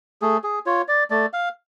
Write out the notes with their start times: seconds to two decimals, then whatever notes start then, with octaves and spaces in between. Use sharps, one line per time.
0.21 A3 G#4
0.44 G#4
0.66 F4 C#5
0.88 D5
1.11 A3 D5
1.33 F5